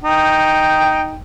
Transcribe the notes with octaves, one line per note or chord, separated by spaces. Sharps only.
D#4 G5